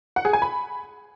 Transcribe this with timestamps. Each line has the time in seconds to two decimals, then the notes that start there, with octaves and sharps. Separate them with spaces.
0.16 F#5
0.25 G#4
0.33 G#5
0.42 B5